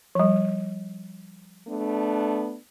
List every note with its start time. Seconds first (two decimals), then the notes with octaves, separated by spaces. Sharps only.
0.15 F3 G3
1.68 A3 B3 D4